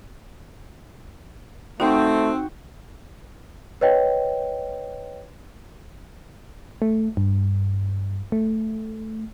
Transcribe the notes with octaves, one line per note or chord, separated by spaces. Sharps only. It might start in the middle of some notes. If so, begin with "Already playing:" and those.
A3 C4 D#4 F#4 G5 C6
B4 C#5 D#5 G5
A3
G2
A3